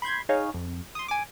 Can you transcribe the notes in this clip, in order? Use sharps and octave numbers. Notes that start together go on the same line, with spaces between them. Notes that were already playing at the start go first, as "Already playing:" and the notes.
B5 C6 G6 G#6
D#4 G#4 C#5 F5
F2
C6 D#6
G#5 D6